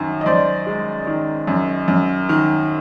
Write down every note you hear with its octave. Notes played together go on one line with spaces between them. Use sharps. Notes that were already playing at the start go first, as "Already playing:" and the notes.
Already playing: F#2 D#3
D#5
F#2 C5 D5
G#3
D#3
F#2
F#2
D#3